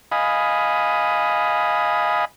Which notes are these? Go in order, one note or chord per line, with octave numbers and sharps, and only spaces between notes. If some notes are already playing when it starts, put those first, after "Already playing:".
D#5 F5 G#5 B5 D#6